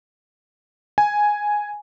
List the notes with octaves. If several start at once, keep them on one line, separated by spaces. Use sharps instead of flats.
G#5